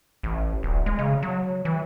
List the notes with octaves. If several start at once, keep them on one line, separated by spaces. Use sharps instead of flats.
A1
D1
G#3
C#3
F#3
E3